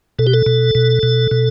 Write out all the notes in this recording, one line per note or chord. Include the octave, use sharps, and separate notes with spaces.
B2 A4
G4
A4
B2
B2
B2
B2